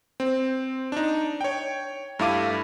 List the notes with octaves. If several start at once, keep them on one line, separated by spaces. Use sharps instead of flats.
C4
D4 D#4
C#5 G5
G2 A3 E4 F5 D6 D#7